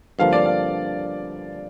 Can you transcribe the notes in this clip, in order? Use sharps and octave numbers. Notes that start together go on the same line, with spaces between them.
G2 D3 F3 A#3 F5
D5
F5